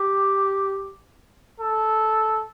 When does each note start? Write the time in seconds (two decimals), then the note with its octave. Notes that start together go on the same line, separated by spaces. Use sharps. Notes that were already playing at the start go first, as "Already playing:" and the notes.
Already playing: G4
1.60 A4